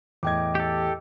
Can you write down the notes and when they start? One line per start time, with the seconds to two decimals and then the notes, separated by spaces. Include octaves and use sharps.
0.23 E2 A2 D#5 G5 D6 G#6
0.55 G4 A4